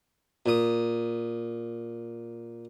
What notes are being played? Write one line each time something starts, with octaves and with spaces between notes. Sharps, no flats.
A#2 D#6